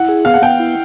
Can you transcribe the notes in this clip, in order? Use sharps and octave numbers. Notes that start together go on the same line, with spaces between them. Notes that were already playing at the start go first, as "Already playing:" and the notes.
Already playing: E4 F#5
G#4
B3 F5
F#5
B3 G5
E4